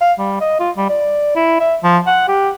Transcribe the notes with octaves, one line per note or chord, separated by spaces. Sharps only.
F5
G3
D#5
F4
G3
D5
E4
E5
F3
F#5
G4